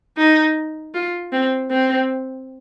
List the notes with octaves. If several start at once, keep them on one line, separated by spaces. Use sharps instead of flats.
D#4
F4
C4
C4